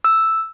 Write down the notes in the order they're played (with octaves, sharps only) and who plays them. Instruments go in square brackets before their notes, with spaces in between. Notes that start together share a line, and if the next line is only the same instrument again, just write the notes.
[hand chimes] E6